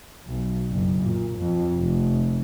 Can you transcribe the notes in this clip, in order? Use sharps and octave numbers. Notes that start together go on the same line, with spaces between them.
B1
F#1
A#2
F2
F1